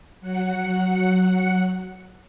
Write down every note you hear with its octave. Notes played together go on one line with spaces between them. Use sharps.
F#3 F#5 C#7